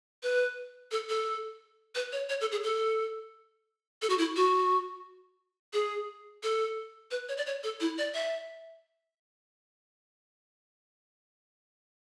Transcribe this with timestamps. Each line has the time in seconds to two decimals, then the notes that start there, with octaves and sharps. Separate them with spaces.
0.23 B4
0.92 A4
1.09 A4
1.95 B4
2.12 C#5
2.29 C#5
2.41 A4
2.52 G#4
2.63 A4
4.02 A4
4.10 F#4
4.18 E4
4.36 F#4
5.73 G#4
6.43 A4
7.11 B4
7.29 C#5
7.37 D5
7.47 C#5
7.64 A4
7.80 E4
7.98 D5
8.14 E5